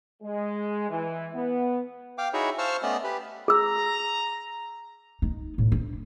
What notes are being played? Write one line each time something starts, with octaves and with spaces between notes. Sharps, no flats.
G#3
E3
B3
F5 G5 D6
D#4 E4 F#4 G#4 C#5 E5
C5 F5 A5 C#6 E6 F6
A3 B3 C#4 D5 D#5 D#6
G4 B4
G#4 A#5 E6
D#4
A2
D4